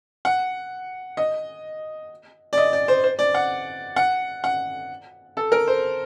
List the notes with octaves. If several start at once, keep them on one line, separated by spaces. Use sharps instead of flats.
F#5
D#5
D5
D#5
D5
C5
C5
D5
F#5
F#5
F#5
A4
A#4
C5